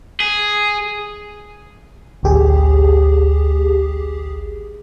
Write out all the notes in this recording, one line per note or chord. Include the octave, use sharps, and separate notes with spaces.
G#4
A1 D2 G4 G#4